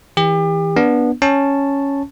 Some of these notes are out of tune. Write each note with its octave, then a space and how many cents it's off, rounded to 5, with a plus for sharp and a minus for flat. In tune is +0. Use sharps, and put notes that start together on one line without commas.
E3 -25 G4 +35
B3 -20 D4 -5
C#4 +0 A5 +0 C#6 +0